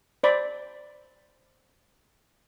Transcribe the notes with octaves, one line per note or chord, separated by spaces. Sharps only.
C5 D5 B5